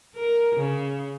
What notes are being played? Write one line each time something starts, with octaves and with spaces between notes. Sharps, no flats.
A#4
C#3